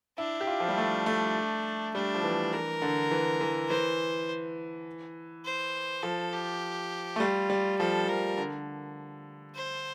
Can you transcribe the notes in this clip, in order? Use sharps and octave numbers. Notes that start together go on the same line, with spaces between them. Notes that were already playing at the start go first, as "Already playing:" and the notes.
D4 E4
G4
F4
F3
G3
A3
A3
G3 D4
F3
E3
E3 A#4
D3
E3
E3
E3 C5
C5
F3 A4
G4
A3
G3 F4
G3
F3 A4
F3 A#4
D3
C5